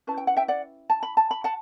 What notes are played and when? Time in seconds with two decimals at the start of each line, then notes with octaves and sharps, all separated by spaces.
0.07 C#4 E4 B4 A5
0.18 G5
0.27 F#5
0.37 E5 G5
0.48 D5 F#5
0.90 A5
1.03 B5
1.17 A5
1.31 B5
1.44 F#5 A5